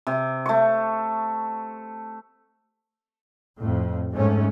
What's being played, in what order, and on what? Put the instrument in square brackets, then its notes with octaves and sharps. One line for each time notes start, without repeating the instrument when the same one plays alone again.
[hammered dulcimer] C3
A3 C#6
[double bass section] F2 A2
G#2 A3 C#4